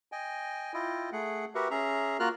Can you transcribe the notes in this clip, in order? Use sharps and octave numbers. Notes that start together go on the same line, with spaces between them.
D#5 G5 G#5
E4 F4 D#5 G5
A3 G#4 F#5
F#4 G4 A#4 B4 E5 F#5
C#4 G#4 E5 A#5
A#3 F4 F#4 A#4 F6 F#6